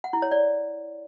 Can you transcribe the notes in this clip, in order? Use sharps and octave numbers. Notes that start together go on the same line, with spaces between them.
F#5
E4
C#5
D5